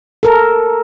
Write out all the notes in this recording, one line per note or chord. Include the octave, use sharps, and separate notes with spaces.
A4 A#4